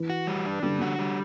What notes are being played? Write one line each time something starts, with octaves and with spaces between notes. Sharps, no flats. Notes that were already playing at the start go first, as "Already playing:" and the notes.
Already playing: E3
F#4
G3
D4
D3 G3
D3 F#4
G3